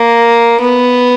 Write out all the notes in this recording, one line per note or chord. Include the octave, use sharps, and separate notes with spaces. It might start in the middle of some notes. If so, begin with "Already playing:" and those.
Already playing: A#3
B3